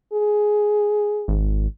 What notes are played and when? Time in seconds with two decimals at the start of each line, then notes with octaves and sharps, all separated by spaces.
0.13 G#4
1.28 G#1